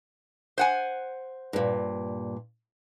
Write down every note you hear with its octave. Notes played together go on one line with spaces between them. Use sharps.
C5 F#5 G#5
G2 A#2